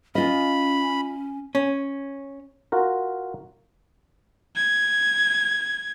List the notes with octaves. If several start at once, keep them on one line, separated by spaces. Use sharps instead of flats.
C#4 F4 D#5 B5
C#4
F4 F#4 A#4
G#6